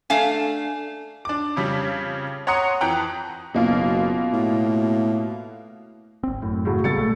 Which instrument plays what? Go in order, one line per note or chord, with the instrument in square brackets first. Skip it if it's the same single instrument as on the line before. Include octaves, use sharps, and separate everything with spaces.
[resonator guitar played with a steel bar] A3 D4 F5 G#5
[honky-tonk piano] D4 D6
F2 C#3 G3
C#5 F#5 A#5 C6 D#6 C#7
F2 E3 G5 A#5 F#6
[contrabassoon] F#1 [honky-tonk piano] B2 A#3 F4
[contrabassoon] A2
[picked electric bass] G#1 C4
[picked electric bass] F#2 [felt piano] A2
[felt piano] A2 C#3 F#3
[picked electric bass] C#3 G3 B3 [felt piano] A3 A6 C#7
[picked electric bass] A#1 A#2 G#3 [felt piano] A3